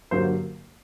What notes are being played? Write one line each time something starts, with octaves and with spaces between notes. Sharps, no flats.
G2 D3 F#3 A#3 C5